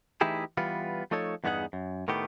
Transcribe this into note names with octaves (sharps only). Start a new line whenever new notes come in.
E3 A3 D#4 E4 G4 G#4
E3 G3 B3 F4
F3 A3 D#4 A4 C#5
E2 G2 B3 D#4 G#4 F#5
F#2
A2 D#3 A3 B3 G4